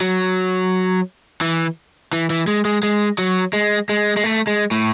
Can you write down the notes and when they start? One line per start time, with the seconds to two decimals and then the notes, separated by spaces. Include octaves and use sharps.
0.01 F#3
1.41 E3
2.13 E3
2.30 E3
2.48 G#3
2.65 G#3
2.83 G#3
3.18 F#3
3.53 G#3
3.89 G#3
4.17 G#3
4.24 A3
4.47 G#3
4.71 A2